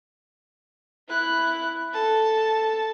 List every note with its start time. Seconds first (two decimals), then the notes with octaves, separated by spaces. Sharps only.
1.09 E4 F#6
1.93 A4 A5